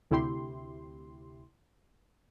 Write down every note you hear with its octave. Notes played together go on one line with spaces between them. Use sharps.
D2 C3 E4 G4 C6